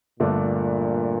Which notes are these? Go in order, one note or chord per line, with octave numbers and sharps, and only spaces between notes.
G1 G2 A#2 D3 A3 D4